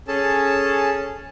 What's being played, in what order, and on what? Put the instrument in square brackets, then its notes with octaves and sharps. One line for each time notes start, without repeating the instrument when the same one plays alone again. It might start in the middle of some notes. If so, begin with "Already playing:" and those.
[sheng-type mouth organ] C#4 G#4 A4 A5